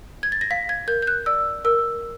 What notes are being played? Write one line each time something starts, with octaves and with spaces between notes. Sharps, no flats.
G#6
A6
A#6
F5 B6
G#6
A#4 G6
G6
F#6
D5 E6
A#4 E6